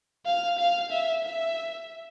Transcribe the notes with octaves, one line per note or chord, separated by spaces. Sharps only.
F5
F5
E5
E5